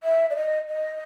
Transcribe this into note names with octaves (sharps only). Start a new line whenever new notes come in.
E5
D5
D#5
D#5